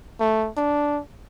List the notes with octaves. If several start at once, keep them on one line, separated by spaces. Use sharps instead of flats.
A3
D4